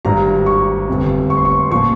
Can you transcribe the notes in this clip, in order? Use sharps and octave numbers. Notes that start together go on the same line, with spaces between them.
G#1 G2 G3 A#5
C#6
G1 F2 C3
C#6
C6
C#6
A#2 F3 C#6